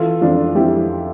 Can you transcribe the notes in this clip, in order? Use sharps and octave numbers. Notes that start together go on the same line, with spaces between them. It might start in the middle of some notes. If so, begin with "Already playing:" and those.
Already playing: E3 F4 A4
F2 D4 F4
F2 E4 G4